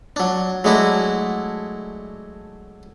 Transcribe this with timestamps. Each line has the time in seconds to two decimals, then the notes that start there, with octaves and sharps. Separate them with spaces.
0.16 F#3 D4
0.64 F#3 G#3 A3 D4 E4 F#4